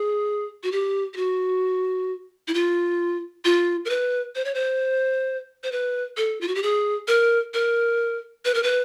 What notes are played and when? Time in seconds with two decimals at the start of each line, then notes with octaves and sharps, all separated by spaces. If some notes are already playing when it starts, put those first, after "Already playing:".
Already playing: G#4
0.63 F#4
0.72 G4
1.14 G4
1.17 F#4
2.48 E4
2.54 F4
3.45 F4
3.85 A#4
3.90 B4
4.35 C5
4.45 C#5
4.54 C5
5.64 C5
5.72 B4
6.17 A4
6.41 F4
6.48 F#4
6.55 G4
6.63 G#4
7.08 A#4
7.54 A#4
8.45 B4
8.54 A#4
8.63 B4